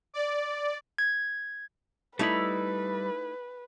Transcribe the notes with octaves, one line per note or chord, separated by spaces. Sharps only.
D5
G#6
G3 A3 D#4 E4 B4 B5